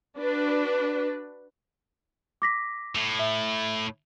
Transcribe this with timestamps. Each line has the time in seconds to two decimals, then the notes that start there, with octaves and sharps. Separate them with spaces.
0.16 D4 F#4 B4
2.42 D6 A#6 B6
2.96 A2
3.19 E5